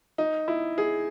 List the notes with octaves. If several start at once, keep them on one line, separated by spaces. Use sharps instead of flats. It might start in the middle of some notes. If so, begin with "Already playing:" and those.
D#4
E4
G#4